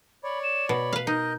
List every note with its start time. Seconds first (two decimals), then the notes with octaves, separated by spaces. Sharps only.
0.24 C#5 D5 B5
0.43 E7
0.69 B2 B5
0.93 B4 F5
1.07 D#4 A#4 D#5 G6